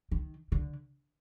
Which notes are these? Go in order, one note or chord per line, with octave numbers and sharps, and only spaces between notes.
D#3
D3